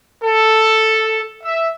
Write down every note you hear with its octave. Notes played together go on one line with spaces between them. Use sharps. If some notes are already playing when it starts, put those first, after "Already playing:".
A4
E5